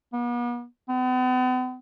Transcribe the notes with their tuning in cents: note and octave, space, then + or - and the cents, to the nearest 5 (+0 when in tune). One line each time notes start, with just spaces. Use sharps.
B3 -40
B3 +45